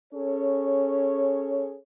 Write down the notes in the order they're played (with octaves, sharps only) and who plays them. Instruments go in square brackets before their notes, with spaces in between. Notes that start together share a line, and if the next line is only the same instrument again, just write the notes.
[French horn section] C#4 G#4 A4 C#5